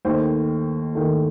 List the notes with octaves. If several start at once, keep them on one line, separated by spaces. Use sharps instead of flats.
D#2 D#3 A3 C5
D#2 D#3 A3